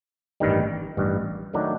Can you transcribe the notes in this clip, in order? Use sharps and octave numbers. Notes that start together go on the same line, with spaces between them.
A1 G2 D#3 G3
A1 G2 D#3 G3
D#3 F#3 A3 D4